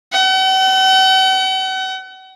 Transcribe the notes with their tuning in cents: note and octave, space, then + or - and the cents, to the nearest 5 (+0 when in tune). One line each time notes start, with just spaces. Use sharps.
F#5 +45